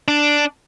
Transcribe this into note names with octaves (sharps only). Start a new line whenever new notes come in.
D4